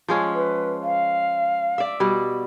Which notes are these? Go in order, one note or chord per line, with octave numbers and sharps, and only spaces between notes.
F3 G#3 C#4
B4
F5
D5 E5
B2 G3